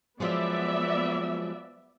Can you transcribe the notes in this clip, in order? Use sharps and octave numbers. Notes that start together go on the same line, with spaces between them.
F3 F#3 G#3 B3 D5 E5